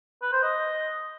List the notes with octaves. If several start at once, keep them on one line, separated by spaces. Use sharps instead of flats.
B4
C5
D#5